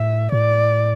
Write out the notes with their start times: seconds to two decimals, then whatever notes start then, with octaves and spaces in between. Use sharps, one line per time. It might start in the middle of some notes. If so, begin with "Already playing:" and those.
Already playing: A2 E5
0.32 A2 D5